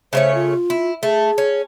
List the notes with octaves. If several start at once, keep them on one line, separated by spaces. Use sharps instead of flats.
C#3 A3 C5 C#5
F4
E4
A3 G#4
C#4